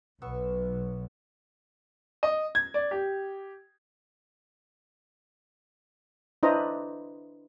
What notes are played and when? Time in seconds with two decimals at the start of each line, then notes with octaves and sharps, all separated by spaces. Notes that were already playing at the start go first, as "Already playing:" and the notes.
0.22 B1 B3 C#6 E6
2.23 D#5
2.55 G#6
2.74 D5
2.91 G4
6.43 D4 E4 B4 C5 D#5 A#5